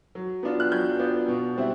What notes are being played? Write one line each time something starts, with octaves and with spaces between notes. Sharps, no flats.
F#3
B3 D4 F4
F#6
F#3 G6
B3 D4 F4
B2
G3 C4 E4